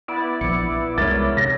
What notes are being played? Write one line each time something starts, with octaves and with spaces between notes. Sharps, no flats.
B3 E4 D5
A#1 F3 C#7
C2 G#3 A#4 C#5 A6
C3 A#6